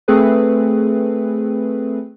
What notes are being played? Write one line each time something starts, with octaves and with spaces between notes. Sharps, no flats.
A3 C4 G#4 A4 B4